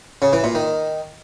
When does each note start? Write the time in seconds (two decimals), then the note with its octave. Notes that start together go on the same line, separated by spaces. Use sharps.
0.22 C#3
0.33 E3
0.44 A#2
0.55 D#3